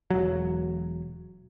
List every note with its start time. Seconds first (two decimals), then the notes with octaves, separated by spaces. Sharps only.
0.10 E1 F#3